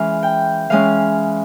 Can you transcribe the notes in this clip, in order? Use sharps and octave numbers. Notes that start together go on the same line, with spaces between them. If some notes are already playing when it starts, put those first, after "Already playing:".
Already playing: E3 G#3 C#4 F5
G5
E3 G#3 C#4 F5